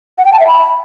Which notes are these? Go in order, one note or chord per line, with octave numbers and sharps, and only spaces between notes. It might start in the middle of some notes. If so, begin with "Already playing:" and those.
F#5
G5
A5
E5
B5